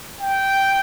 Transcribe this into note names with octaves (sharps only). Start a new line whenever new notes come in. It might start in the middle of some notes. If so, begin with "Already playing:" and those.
G5